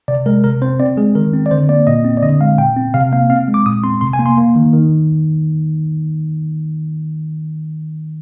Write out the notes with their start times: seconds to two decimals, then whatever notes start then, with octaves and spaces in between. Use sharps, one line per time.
0.08 C3 D5
0.26 G#3 A#4
0.44 C3 A#4
0.62 C4 C5
0.80 C4 D5
0.97 G#3 G#4
1.15 D#3 A#4
1.33 C4
1.46 D5
1.51 D3 C5
1.69 A#3 D5
1.87 A#2 D#5
2.05 C4
2.17 D5
2.23 D3 D#5
2.41 G#3 F5
2.58 A#2 G5
2.76 C4
2.94 C3 F5
3.12 A#3 F5
3.30 C4 F5
3.48 G#3
3.54 D6
3.66 A#2 D#6
3.84 C4 C6
4.01 C3 C6
4.13 G#5
4.19 A#3
4.26 C6
4.37 A#3
4.56 D#3
4.73 D#3